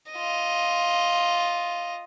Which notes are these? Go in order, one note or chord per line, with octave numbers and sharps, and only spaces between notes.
F4 D#5